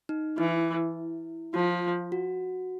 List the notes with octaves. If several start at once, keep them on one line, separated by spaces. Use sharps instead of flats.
D#4
E3 E4
F3 F4
F#4